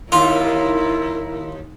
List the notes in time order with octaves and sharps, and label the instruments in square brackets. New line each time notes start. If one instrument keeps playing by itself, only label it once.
[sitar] D#2 [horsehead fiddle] E4 A#4 [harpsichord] F4